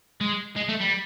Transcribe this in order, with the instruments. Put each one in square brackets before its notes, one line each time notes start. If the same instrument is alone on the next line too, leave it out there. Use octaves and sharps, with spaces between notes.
[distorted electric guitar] G#3
G#3
A3
G3